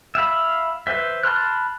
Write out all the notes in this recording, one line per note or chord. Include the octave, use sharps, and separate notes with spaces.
E5 F5 B5
B4 C5 E5
A5 B5 C6 F6 F#6